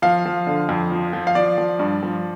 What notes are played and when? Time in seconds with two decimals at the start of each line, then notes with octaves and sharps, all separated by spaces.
0.02 F3 F5
0.25 F3
0.47 D3
0.69 F2
0.92 F3
1.13 F3
1.27 F5
1.35 F3 D5
1.58 F3
1.79 G2
2.03 F3